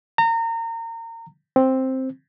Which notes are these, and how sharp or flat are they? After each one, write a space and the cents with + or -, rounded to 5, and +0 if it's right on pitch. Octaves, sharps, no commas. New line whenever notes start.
A#5 -30
C4 +5